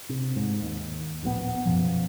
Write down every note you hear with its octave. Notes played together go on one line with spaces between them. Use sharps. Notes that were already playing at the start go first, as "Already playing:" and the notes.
C3
G#2
D#2
D1 A#1 A#2 B3
F#2 B2 F3